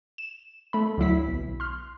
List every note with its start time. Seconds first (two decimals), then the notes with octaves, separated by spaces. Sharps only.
0.18 E7
0.73 A3 B5
0.98 D2 F#3 E4 B6
1.28 B1
1.60 C6 F6